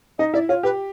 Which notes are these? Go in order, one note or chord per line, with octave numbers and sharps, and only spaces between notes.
D#4 D#5
E4 D5
F4 C#5
G4 B4